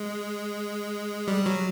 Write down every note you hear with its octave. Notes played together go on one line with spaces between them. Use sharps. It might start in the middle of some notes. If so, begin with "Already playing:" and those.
Already playing: G#3
G3
F#3